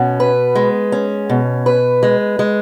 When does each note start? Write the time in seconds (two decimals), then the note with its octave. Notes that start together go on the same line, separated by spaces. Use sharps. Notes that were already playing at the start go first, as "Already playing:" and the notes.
Already playing: B2 C#4
0.20 B4
0.55 G#3
0.92 C#4
1.29 B2
1.66 B4
2.03 G#3
2.39 G#3